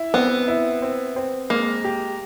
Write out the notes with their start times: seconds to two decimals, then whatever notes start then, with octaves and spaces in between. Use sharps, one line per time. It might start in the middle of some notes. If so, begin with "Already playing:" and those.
Already playing: E4
0.14 B3 C4
0.48 E4
0.82 C4
1.16 C4
1.50 G#3 A#3
1.84 G4